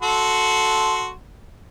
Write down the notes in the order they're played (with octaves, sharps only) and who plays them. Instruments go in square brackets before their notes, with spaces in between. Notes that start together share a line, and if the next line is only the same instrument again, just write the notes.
[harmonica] F#4 A4 C6